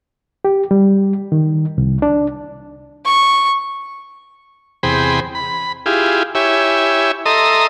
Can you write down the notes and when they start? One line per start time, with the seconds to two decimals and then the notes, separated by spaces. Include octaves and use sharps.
0.45 G4
0.71 G3
1.32 D#3
1.78 C2
2.02 D4
3.05 C#6
4.83 E2 C3 G#4 C5 G5 B5
5.35 B5
5.86 E4 F4 G4 G#4
6.35 E4 G4 C#5 E5 G#5
7.26 A4 D#5 E5 A#5 C6 D#6